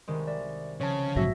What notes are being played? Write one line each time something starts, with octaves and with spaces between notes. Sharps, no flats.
C2 D#3 G#3
D5 E5
C#3 F3 C#5 A5
A#1 G#2 F#3 F#4 E5 A#6